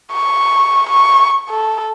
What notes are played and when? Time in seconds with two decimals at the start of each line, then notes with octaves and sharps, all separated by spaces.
0.13 C#6
0.89 C#6
1.50 A4